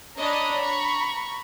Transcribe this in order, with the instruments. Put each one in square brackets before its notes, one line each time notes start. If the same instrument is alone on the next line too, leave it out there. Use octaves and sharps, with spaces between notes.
[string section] D4 C#5 D#5 [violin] A#5 B5
[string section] C#6